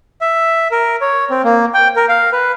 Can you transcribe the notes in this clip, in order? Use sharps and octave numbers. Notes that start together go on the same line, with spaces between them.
E5
A#4
C#5
C4
A#3
G5
A#4
F5
B4